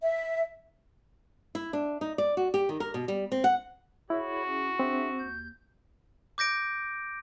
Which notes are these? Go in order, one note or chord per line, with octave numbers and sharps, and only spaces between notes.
E5
E4
D4
D#4
D5
F#4
G4
D#3
A#4
B2
G3
C4
F#5
E4 F#4 G#4 C#5 B5
C#4 G#4
C4 D4 G#4 E5
D#2 G6
D6 G6 A#6 D7